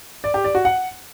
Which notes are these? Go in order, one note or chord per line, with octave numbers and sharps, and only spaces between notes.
D5
G4
D5
F#4
F#5